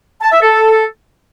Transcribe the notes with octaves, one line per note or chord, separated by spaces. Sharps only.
A5
E5
A4